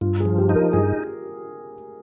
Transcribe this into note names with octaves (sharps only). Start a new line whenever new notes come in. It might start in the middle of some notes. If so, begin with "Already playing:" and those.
G2 F4
G#4
F3
G4
D#4
A#4
G2 G#4